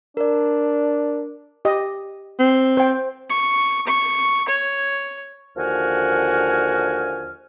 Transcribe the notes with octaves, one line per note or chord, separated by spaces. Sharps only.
D4 A#4 D5
G4 D#5
C4
C5 G5
C#6
C#6
C#5
D#2 D3 F3 F#4 G#5 F6